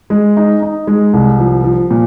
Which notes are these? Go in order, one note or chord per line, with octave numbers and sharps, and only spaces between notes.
G#3
D#4
D#4
G#3
C2
F3
F3
A#2